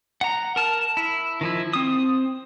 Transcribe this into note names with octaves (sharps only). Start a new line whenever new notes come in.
F#5 A#5
A#4 A5 F6
E4
D#3 F3 E4
C4 D#6